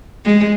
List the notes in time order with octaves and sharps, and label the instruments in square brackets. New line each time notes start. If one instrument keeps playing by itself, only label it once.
[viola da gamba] G#3